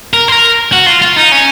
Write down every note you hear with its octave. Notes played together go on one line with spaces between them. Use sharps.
A#4
C5
A#4
F#4
F4
F4
D#4
C#4